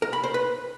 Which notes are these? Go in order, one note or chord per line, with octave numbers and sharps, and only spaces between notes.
A#4
B5
C5
B4